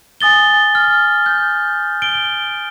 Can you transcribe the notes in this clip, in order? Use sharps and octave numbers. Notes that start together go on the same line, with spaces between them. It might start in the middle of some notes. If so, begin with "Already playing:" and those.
G#5 D#6 A6 G7
F6
G6
D7 G7